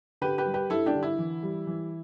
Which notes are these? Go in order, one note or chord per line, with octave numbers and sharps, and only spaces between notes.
D3 G4 B4
G4 B4
G3
G4 B4
G2 E4 A4
D4 G4
D3
E4
E3
G3
E3